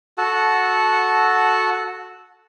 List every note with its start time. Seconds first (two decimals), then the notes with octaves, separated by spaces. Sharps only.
0.18 F#4 A4 F#5 A5